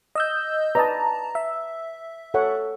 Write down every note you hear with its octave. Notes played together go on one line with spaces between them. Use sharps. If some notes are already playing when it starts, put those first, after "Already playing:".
D#5 E6 G6
B4 D5 D#5 A5 A#5
E5
A4 C#5 F#5